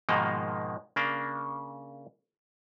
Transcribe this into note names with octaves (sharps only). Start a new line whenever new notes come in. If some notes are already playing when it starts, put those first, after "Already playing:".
G#2 B2 D#3 F3 G#3 A#3
C#3 A#3 D4